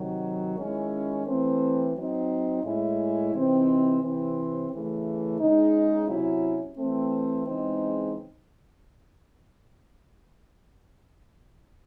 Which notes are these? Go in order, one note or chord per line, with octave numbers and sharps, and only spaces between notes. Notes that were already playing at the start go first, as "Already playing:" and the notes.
Already playing: C3 D#3 F#3
D#3 G#3 C#4 E4
E3 A3 C4
F#3 C4 D#4
A2 G#3 C#4 E4
C3 E3 C4 D#4
C3 E3 C4
C#3 E3 A3
C#3 G#3 D#4
C3 F#3 C#4 E4
E3 A3 C4
C#3 E3 G#3 C4 D#4